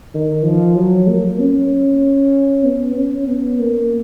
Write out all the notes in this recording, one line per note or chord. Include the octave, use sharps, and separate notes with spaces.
D#3
F3
F#3
A#3
C#4
B3
C#4
B3
A#3